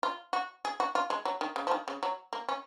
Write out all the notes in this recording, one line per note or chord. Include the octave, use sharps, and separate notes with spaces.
F4
F#4
G#4
F#4
F4
G#3
F#3
D#3
C#3
F3
D#3
C#3
F#3
A#3
C#4